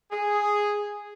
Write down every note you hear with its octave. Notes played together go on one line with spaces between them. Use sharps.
G#4